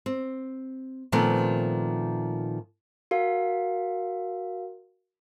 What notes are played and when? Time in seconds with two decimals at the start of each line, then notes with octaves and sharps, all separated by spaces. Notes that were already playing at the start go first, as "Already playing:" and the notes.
0.06 C4
1.12 A#2 D#3 F3 A3 B3 C4
3.11 F#4 A#4 F5